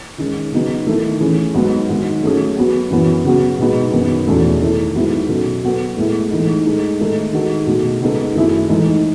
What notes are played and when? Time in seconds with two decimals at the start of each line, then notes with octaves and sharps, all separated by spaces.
0.18 D#3 G#3 C#4
0.52 C#3 F#3 B3 D#4 G#4
0.87 D#3 A3 E4
1.20 E3 A3 C#4 G#4
1.54 G#2 F#3 B3 D#4
1.89 G#2 D#3 F#3
2.23 F#3 A3 C#4 G#4
2.56 F#3 B3 F#4
2.90 F#2 E3 B3
3.24 C#3 F#3 B3 F#4
3.59 B2 G#3 B3 D#4
3.92 F#2 D#3 F#3 B3
4.27 E2 B2 A3 C#4
4.61 D#3 A3 E4 A4
4.95 G#2 F#3 B3 E4 G#4
5.29 B2 F#3 C#4 F#4 A4
5.63 F#3 B3 F#4 A4
5.97 A2 G#3 B3 E4 A4
6.31 G#2 E3 A3 D#4 A4
6.65 A2 G#3 D#4 A4
6.99 G#2 D#3 A3 D#4 A4
7.33 D#3 G#3 D#4 F#4 A4
7.67 B2 A3 D#4 G#4
8.01 C#3 G#3 B3 D#4 A4
8.35 F#2 D#3 A3 E4 G#4
8.69 G#2 E3 A3 D#4